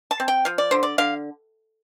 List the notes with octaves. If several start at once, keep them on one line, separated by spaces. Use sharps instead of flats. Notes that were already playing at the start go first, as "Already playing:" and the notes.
A5
C4
G5
F3 F5
D5
D3 C5
D5
D3 F5